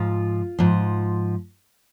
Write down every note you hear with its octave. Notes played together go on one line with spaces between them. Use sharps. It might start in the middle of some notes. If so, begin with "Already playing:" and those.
Already playing: G#2 F3 F4
G#2 F3